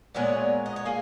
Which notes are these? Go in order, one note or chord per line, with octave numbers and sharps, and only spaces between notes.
A#2 G#3 B3 A#4 C#5
D#5
C#5
A#3 G#4